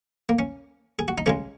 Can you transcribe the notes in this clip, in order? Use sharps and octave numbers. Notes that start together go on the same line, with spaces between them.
A#3
C#4
G#4
F#4
D#4
C#2 C#3 G#3 C#4